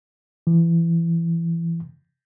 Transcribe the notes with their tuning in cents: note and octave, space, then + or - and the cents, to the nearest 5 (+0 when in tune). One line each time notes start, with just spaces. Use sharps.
E3 +25